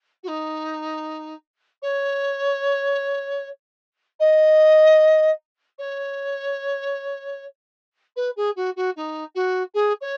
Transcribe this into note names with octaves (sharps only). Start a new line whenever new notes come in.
F#4
D#4
C#5
D#5
C#5
B4
G#4
F#4
F#4
D#4
F#4
G#4
C#5